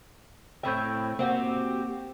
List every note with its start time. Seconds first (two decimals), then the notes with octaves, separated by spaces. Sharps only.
0.63 A2 C4 E5 G5 B5 G6
1.19 A#3 C4 F#4 G4